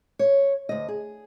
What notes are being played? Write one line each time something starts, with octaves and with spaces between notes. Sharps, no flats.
C#5
D2 D#5
G#4